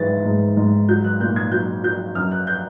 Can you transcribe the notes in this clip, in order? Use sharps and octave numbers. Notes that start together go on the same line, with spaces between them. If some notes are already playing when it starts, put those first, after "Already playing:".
Already playing: G#2 E3 A6
G#2
G#2
F#3 G6
F#6
A#2 G6
G#6
F#3 G6
F#3 G6
F#2 F6
F#6
G6